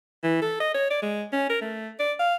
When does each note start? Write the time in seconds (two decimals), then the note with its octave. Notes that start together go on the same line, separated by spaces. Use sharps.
0.24 E3
0.42 A4
0.60 D#5
0.74 C#5
0.90 D5
1.02 G#3
1.33 C#4
1.50 A#4
1.61 A3
1.99 D5
2.19 F5